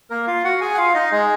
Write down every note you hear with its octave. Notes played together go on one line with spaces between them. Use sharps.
A#3 A#4
F4 F5
F#4 F#5
G#4 G#5
F#5
F4 F5
D#4 D#5
G#3 G#4